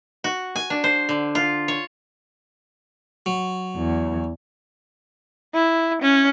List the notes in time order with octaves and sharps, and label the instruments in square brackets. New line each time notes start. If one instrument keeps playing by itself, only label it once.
[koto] F#4
G#5
D4
C5
D3
F4
C#5
[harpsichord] F#3
[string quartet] E2
[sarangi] E4
C#4